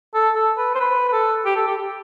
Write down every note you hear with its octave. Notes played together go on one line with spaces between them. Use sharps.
A4
A4
B4
C5
B4
B4
A4
G4
A4
G4